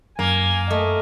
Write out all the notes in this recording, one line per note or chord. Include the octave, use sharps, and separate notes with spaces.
F#2 A#3 G#5
A3 D#5